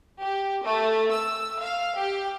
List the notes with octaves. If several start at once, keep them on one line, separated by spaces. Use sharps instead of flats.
G4
A3
E6
F5
G4